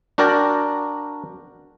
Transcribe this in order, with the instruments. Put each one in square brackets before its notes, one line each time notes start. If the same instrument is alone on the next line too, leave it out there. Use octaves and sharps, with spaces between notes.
[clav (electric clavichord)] D4 F#4 A#4 D5 G5 A#5